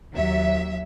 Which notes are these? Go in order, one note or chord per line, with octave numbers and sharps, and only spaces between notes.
D#2 F#3 E5